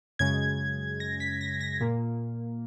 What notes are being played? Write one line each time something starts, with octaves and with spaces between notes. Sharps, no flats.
F#2 C#3 G#3 G#6
A#6
B6
A#6
A#6
A#2 A#3